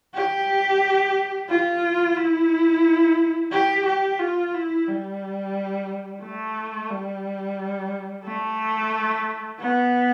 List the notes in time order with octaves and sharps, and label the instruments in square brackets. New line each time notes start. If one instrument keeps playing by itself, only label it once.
[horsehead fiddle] G4
F4
E4
G4
G4
F4
E4
G3
A3
G3
A3
B3